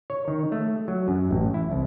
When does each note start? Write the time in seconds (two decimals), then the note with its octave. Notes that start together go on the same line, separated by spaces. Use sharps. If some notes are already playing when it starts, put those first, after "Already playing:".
0.10 C#5
0.28 D#3
0.52 A3
0.88 F#3
1.08 F#2
1.31 A1
1.54 E4
1.71 C2